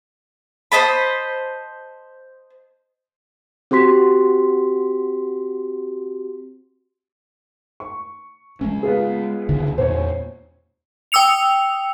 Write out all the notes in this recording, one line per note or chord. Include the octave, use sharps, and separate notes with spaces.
C5 D#5 A5 B5
C4 F#4 G4 C6 B6
C#6
G#3 A3 C#4
B3 F4 G#4
C#2 D3 D#3
E2 A#2 C5 C#5
G5 D#6 E6 C#7 F7